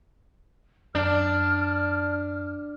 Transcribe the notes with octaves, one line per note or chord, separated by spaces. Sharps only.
F#2 D4 D5 F6